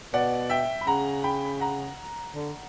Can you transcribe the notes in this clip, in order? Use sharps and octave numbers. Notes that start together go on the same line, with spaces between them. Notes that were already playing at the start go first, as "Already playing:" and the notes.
B2 D5 F#5
E5 G5
B5
C#3 F#5 A#5
G5 B5
F#5 A#5
D3